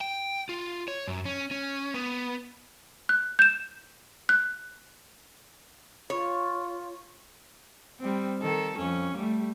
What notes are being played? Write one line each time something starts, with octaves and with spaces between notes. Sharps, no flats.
G5
F4
C#5
F#2
C#4
C#4
B3
F#6
G6 E7
F#6
F4 C#5
G3 C4
D#3 A4
F2 C#4
G3 A3